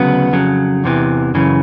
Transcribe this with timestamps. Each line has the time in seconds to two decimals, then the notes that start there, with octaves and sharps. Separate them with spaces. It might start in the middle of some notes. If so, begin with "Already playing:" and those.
Already playing: D2 C#3 F#3 B3
0.33 F2 C#3 F#3
0.84 E2 C3 E3
1.35 F#2 C#3 E3